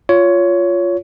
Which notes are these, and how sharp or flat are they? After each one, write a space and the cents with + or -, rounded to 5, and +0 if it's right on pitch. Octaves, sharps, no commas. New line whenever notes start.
F4 +0 C#5 +15